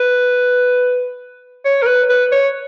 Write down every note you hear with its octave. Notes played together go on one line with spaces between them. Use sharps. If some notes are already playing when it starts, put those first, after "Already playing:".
Already playing: B4
C#5
A#4
B4
B4
C#5